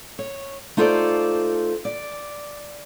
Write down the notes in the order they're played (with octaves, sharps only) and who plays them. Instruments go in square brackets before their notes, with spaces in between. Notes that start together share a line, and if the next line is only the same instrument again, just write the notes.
[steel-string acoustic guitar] C#5
A3 D#4 F4 A4 C5 D5
D5